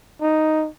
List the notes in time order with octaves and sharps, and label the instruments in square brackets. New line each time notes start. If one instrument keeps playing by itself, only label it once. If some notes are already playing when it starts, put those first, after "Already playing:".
[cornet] D#4